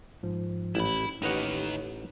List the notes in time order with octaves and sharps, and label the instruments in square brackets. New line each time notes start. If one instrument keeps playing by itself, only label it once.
[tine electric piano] G#2 F3
[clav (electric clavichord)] A1 [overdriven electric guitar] E4 B5
[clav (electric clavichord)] A1 D#5 F#5 [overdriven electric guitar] D#3 G4 [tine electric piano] D#4 B4 C#5